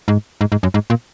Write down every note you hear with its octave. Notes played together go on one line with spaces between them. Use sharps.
G#2
G#2
G#2
F#2
G#2
A#2